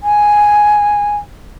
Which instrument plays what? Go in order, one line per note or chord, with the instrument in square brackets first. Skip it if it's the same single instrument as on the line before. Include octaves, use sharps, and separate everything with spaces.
[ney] G#5